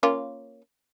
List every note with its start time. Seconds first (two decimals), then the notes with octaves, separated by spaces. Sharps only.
0.03 A#3 C#4 F4